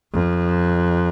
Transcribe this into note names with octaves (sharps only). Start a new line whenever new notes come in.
F2